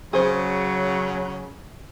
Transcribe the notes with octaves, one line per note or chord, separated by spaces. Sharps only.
C#3 F#3 G#4 C5